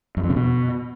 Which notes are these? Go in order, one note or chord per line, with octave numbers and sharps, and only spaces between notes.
F#2
F2
C#3
B2